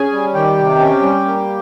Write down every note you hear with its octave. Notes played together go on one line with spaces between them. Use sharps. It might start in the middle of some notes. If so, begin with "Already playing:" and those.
Already playing: C#4 G#4 G#5
G3
D#3 G4 G5
C3
C#4
G3
A#3